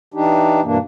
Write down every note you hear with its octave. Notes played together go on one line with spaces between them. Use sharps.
E3 D4 D#4 G4
G2 B2 E3 A#3 D4